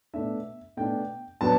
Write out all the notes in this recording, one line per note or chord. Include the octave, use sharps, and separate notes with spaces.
B2 A3 D4 E5
B2 A3 D4 G5
B2 F#3 B3 D4 A5